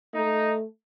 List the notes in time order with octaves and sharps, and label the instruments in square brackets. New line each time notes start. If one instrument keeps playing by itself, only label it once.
[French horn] A3 [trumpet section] D#4